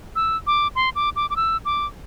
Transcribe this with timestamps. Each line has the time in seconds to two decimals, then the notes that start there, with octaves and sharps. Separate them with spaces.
0.16 E6
0.47 D6
0.76 C6
0.95 D6
1.16 D6
1.30 D6
1.36 E6
1.65 D6